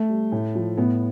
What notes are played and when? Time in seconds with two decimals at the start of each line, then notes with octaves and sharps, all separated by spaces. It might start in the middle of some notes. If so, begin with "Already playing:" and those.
Already playing: A3
0.09 G3
0.32 A2
0.55 F3
0.77 A2 B3